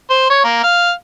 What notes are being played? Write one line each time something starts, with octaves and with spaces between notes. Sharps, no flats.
C5
C#5
A#3
F5